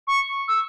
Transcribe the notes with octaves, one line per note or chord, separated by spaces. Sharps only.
C#6
E6